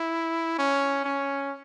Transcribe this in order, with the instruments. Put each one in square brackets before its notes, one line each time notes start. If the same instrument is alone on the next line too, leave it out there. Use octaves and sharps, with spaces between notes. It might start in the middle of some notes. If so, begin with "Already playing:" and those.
Already playing: [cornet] E4
C#4
C#4